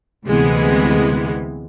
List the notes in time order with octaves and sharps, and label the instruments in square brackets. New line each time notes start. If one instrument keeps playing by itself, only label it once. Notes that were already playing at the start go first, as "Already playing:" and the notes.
[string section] D2 C3 E3 G#3 B3